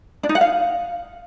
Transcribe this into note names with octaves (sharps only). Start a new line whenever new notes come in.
D4
D#4
F#5
F5